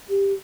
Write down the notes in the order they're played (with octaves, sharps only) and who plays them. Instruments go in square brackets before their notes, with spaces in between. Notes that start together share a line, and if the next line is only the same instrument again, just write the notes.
[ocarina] G4